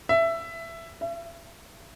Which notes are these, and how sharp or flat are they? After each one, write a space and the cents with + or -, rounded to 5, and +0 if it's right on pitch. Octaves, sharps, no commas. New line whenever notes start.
E5 +15
E5 +40